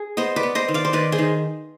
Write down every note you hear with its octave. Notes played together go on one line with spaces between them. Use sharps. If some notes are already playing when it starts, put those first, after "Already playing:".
Already playing: G#4
B3 C5 D#5
B4 D5
B3
C5 D#5
D#3
D5 F5
C5
D#3 B4 D5
G#4 C5
D#3